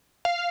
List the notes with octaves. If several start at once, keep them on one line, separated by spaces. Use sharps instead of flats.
F5